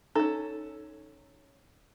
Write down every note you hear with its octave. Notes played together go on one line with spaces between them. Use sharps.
C#4 D#4 A4